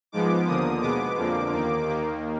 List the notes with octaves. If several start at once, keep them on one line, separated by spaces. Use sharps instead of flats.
G#2 F3 G#3 B3 D6
D#2 D3 F3 A#3 D#6
B2 G#3 B3 D6
F2 D3 F3 A#3
D#2 D#3 A#3
D#2 D#3 A#3